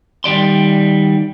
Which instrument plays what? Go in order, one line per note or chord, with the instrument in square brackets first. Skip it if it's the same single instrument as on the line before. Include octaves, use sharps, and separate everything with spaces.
[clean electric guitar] D#3 G3 D5 C6